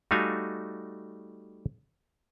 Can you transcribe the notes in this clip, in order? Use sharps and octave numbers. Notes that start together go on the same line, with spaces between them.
G3 A3 D#4 F#4 F5 G#5